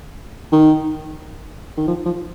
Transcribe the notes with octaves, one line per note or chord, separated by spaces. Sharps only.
D#3
D#3
F3
F3